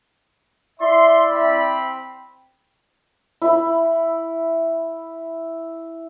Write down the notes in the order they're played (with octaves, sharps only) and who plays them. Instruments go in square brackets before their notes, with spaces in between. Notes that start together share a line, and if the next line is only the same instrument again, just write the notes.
[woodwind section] E4 D5 E5 [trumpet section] C6
[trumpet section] C4 B5
[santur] E4 B5